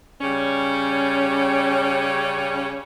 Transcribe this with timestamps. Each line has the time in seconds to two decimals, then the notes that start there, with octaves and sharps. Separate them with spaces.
0.21 C#3 G3 C#4